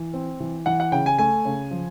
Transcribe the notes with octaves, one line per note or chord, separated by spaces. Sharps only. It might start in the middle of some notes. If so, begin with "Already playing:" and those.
Already playing: E3
C4
E3
E3 F#5
F#5
C#3 G5
G#5
A3 G#5
C#3
F3